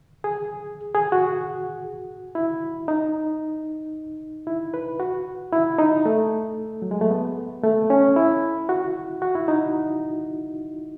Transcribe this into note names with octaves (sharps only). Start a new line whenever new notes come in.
G#4
G#4
F#4
E4
D#4
E4
B4
F#4
E4
D#4
A3
F#3
G#3
A3
B3
A3
C#4
E4
F#4
F#4
E4
D#4